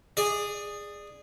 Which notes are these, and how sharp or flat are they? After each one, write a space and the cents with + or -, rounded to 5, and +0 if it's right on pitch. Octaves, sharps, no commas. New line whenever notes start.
G#4 -10 D5 +15